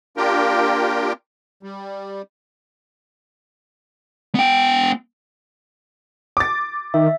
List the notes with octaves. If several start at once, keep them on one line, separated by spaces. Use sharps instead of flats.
A#3 D4 F4 G4 A#4 G5
G3
B3 G5
D6 A6
D#3 E5